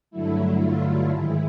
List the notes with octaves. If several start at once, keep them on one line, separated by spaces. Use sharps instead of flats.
G2 D3 F#3 A3 E4
F4
G#2 D#3 G#3 E4